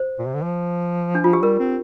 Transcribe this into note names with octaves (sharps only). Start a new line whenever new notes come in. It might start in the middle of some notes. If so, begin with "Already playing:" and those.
Already playing: C5
A#2
C3
D3
F3
D4
F4
G4
G3 A#4
C4